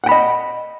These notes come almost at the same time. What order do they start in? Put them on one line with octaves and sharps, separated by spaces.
F#5 G5 B5 D#5